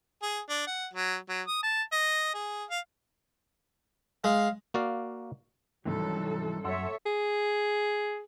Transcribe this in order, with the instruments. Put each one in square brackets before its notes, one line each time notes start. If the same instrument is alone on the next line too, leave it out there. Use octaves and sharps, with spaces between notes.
[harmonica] G#4
D4
F#5
F#3
F#3
D#6
A5
D#5
G#4
F5
[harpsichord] G#3 [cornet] F5
[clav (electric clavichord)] A#3 F#4 D5 F5
[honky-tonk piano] C2 G#2 D#3 [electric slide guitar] E3 F#3 [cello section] G3 C#4 A4
[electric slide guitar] F#2 [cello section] A4 C#5 E5 [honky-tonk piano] F#5 C6 E6
[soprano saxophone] G#4